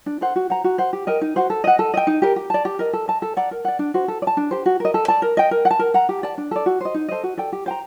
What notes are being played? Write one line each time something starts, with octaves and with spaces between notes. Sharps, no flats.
D4
A4 C5 F#5
F#4
C5 F#5 A#5
F#4
C5 F#5
G4
A#4 D#5 G5
D#4
F#4 C5 F#5
A4
D#5 F#5
A4
D#5 G5
D#4
G4 A#4
G4
D5 A5
G4
A#4 D#5
A4
D#5 A5
A4
D5 F#5 A#5
A#4
D5 F#5
D4
F#4 C5
A4
D5
A5
D4
G4 C5
F#4
A#4 D#5
A4
D5 A5
A#4
D#5 G5
A#4
F#5
A5
A#4
F#5 A#5
G4
D5 A5
D4
A4 D5
F#4
C5 D#5
D#4
A4 C5 D#5
F#4
A4 D5 G5
G4
C5 G5 A#5